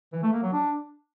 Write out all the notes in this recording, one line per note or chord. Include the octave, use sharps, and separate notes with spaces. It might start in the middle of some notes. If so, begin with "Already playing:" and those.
E3
A3
A#3
F#3
D4